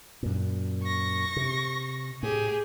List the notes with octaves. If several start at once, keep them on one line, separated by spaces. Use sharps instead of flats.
F#2 A#2
C#6 A#6
C3
A2 G4 G#4